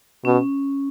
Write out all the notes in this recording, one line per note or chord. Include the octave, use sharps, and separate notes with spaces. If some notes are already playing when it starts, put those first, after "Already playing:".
B2 C#4